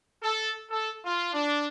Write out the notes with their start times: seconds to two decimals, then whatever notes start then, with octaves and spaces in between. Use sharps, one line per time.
0.22 A4
0.71 A4
1.04 F4
1.34 D4